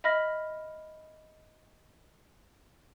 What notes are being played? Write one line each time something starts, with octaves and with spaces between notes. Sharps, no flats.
D#5 E5 B5 F6 A#6